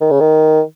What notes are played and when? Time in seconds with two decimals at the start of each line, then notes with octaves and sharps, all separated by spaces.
0.01 D#3
0.11 C#3
0.20 D#3